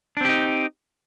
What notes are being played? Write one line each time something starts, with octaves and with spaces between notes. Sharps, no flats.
C4 D4 D#4 G4